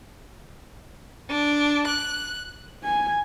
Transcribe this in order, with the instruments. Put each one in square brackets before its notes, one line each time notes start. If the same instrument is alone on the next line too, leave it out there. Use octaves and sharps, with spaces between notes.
[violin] D4
F#6
[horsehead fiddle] G#5